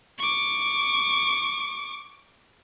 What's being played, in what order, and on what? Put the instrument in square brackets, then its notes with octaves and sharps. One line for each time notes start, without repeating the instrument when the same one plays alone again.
[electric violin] C#6 D6